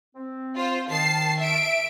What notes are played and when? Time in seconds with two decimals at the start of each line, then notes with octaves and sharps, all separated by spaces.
0.15 C4
0.56 F4 C5
0.89 D#3 A5 C7
1.39 E5 D7